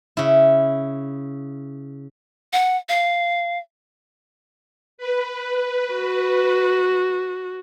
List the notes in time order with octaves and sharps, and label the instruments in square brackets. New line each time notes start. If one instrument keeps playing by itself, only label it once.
[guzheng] C#3 E4
[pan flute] F#5
F5
[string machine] B4
[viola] F#4